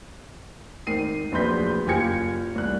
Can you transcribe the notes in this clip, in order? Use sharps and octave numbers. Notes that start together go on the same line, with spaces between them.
G#1 D#3 C7 D#7
D1 A#1 B4 C6 G6 B6
F#1 F4 G4 G#5 G#6 C#7
C2 F#6